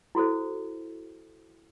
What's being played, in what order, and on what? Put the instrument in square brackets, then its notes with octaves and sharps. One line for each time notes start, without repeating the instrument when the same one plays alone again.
[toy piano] E4 F#4 A4 C5